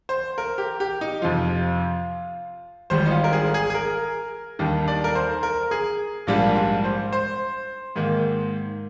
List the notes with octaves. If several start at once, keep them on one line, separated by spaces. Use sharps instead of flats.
C5
A#4
G4
G4
D#4
F2 C3 F3 F4
G#1 G#2 G3 C5
D#4
F4
A#4
G#4
G#4
G#4
A#4
D#2 D#3 G3 D4
D5
A#4
C5
A#4
G#4
A#1 G#2 G3 A#3 D4 F4
F4
C5
C5
G#2 D#3 A#3